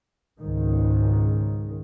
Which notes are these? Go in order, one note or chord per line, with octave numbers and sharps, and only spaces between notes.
C#2 G#2 D#3